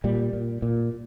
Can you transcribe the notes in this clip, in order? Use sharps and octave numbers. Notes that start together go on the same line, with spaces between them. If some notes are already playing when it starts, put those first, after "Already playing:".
A#2 G3
A#2
A#2